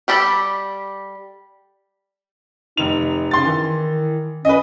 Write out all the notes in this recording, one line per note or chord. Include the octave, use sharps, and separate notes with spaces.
G3 G4 A4 B4 B5
F1 D#4 F7
C#3 C6 A6
D#3 E3
C#4 B4 D#5